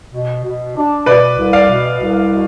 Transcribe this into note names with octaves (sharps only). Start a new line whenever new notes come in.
B2
B2
D4
B2 B4 D5
C2
D5 F5
B2
C2
B2